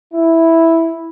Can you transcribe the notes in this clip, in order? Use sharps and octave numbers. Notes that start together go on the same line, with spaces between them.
E4